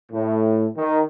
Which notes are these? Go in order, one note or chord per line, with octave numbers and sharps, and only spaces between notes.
A2
D#3